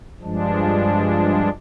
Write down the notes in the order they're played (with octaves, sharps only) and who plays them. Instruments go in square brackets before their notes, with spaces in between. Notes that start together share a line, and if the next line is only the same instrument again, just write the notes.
[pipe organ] G2 F3 G#3 D4